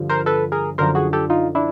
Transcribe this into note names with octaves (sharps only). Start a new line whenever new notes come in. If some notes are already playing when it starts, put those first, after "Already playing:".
Already playing: G2 D3 F3
A#4 C5
A4 B4
G#4 A#4
F#2 D3 F3 A#4 C5
F#4 G#4
G4 A4
D#4 F4
D4 E4